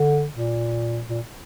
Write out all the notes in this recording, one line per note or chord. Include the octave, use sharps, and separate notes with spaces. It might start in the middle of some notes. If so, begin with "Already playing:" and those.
Already playing: D3
A#2
A#2